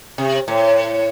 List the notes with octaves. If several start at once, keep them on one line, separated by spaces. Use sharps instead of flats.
C3
A2